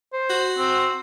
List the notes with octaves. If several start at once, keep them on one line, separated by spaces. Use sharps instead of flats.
C5
F#4
C4